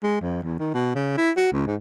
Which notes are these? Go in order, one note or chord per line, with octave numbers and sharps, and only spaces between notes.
G#3
F2
E2
D#3
B2
C#3
E4
F#4
C#2
G#2